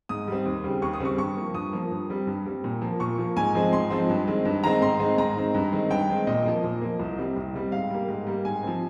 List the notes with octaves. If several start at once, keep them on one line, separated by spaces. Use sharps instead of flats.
G#2 D#6
G3 C4
D#2
C#3 G3 C4
D#2 C#6
D#6
C#3 G3 C4 C#6
G2 C#6
F3 A#3
G2 D#6
F3 A#3
G2
G3 C4
G2
G3 C4
A#2
F3 A#3
A#2 C#6
F3 A#3
G#2 G#5
F3 G#3 C4
G#2 C6
F3 G#3 C4
G2
D#3 G#3 C4
G2
D#3 G#3 C4 A#5
G#2 C6
D#3 G#3 C4
G#2 A#5
D#3 G#3 C4
G2
D#3 G#3 C4
G2 G5
D#3 G#3 C4
A#2 D#5
F3 A#3
A#2
F3 A#3
C2
C3 G3 C4
C2
C3 G3 C4
G#2 F5
G3 A#3
G#2
G3 A#3
G#2 G#5
F3 C4